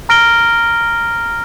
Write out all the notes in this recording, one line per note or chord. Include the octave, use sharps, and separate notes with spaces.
A#5 F6 A#6 D7 G7